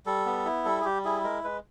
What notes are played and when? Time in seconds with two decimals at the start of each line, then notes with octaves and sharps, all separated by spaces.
0.06 G3 A4
0.26 B3
0.46 E4
0.65 G3 A4
0.81 G#4
0.85 G3 G4
1.05 E4 G#4
1.24 G#3 A#4
1.44 G#3 B4